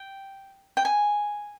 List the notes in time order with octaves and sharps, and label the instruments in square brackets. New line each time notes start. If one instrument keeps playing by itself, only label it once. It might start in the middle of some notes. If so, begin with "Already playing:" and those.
Already playing: [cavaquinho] G5
G5
G#5